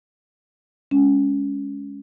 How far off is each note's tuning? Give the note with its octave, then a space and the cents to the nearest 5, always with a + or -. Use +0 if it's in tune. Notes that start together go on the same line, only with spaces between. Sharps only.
G#3 +0 C#4 +15